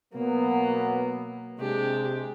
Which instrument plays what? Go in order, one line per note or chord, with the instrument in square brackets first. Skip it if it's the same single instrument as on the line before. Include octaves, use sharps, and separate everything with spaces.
[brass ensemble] B2 F#3 B3 [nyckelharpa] A#3
[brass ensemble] C3 G#3 [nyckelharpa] D4 G4